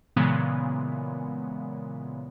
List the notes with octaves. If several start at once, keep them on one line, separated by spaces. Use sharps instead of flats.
A#2 C#3 E3 F#3 G#3 B3